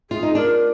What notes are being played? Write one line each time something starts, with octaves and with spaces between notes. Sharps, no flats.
F4 G#4
D#4
D4 F4 A#4